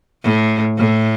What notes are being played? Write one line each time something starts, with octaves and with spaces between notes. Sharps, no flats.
A2
A2